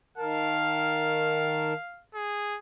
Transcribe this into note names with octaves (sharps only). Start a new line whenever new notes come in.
D#3 A#4 F5 A5
G#4